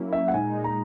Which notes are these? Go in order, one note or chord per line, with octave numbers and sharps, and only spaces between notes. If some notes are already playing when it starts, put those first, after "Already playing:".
Already playing: F#3 A#3 C#4 E4
E5
F#5
A#2 G#3 D#4 G#5
A#5